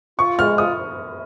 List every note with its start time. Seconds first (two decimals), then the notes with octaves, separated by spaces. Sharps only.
0.19 F4 C#6
0.38 G#3 F6
0.58 F4 D#6